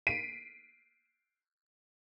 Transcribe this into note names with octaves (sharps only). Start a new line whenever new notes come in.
B6 C7 D7 D#7